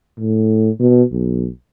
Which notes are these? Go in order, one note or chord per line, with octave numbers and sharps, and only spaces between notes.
A2
B2
B1